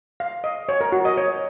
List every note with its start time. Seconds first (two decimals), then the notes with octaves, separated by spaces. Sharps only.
0.20 F5
0.44 D#5
0.69 C#5
0.81 A#4
0.92 F#4
1.05 D#5
1.17 C#5